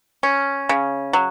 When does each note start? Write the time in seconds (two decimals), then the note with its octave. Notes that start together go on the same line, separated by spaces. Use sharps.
0.23 C#4
0.69 C#3
1.13 F#3